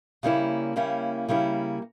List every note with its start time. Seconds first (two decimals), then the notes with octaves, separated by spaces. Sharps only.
0.23 C#3 G3 A#3 C#4 E4
0.76 C#3 G3 A#3 C#4 E4
1.29 C#3 G3 A#3 C#4 E4